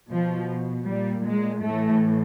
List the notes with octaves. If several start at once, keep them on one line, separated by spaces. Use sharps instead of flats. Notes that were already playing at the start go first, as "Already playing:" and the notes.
B2 F3
A#2 G3
G#3
A2 E3 A3